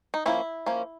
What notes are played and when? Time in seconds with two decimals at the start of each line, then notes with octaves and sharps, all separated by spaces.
0.14 D#4
0.26 F3 A#3 C#4 E4
0.66 F3 A#3 C#4